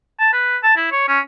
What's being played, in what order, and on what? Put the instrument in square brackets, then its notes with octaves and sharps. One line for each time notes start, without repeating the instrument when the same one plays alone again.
[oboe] A5
B4
A5
E4
C#5
C#4